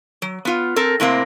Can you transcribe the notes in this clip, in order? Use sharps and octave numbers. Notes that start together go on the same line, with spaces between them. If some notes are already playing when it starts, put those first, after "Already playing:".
F#3
B3 F4
C4 A4 A#4
A2 C3 A#3 C4